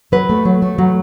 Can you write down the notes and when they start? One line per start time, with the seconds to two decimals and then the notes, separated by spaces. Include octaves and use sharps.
0.12 F#3 B4
0.29 A3
0.45 F#3
0.62 A3
0.78 F#3